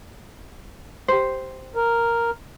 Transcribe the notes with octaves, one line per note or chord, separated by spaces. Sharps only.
G4 C5
A#4